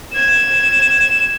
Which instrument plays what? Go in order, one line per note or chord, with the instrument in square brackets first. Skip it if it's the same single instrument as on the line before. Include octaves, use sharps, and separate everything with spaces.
[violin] G#6 E7